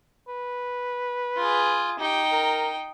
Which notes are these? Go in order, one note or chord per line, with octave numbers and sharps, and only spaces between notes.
B4
F4 G#4
D#4 G4 G5
A#4